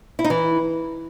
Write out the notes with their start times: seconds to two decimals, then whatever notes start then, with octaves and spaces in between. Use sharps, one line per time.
0.19 E4
0.24 D#4
0.30 E3